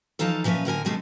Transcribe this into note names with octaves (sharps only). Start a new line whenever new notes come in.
E3 F3 D#4 F4 A4
A#2 F3 C#4 B4 E5
A2 D3 A#4 G#5
B2 D3 G#3 A3 C4